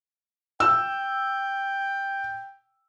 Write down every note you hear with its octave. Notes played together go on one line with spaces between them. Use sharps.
G5 E6